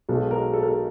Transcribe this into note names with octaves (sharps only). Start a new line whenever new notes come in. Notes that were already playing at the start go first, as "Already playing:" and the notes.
B1 B2 G#3 A4
A#4
A4
A#4
A4